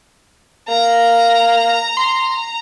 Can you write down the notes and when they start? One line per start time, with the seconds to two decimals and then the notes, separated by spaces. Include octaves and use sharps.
0.69 A#3 A#5
1.97 C6